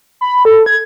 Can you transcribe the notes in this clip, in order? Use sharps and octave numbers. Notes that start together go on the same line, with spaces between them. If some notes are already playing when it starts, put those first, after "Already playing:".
B5
A4
G#6